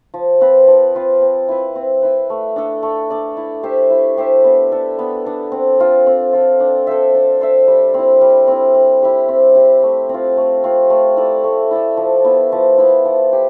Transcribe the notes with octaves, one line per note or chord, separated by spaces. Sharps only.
F3
C4 F4 B4
F3
C4 F4 B4
C4
E4 B4
C4
E4 B4
A3
D4 A4 D5
A3
D4 A4 D5
E4
G4 C5 E5
E4
G4 C5 E5
B3
D4 A4
B3
D4 A4
C4
F4 A4
C4
F4 A4
D4
A4 C5 E5
D4
A4 C5 E5
G3
C4 E4
G3
C4 E4
C4
E4 G4
C4
E4 G4
A3
C4 F4
A3
C4 F4
A3
E4 A4 D5
A3
E4 A4 D5
F3
B3 E4
F3
B3 E4
F3
G4